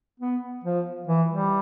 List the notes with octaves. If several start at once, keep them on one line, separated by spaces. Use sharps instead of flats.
B3
F3
E3
G3